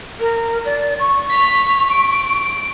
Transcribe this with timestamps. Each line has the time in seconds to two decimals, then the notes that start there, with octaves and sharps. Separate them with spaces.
0.20 A#4
0.66 D5
1.00 C#6
1.30 B6 F7
1.89 D7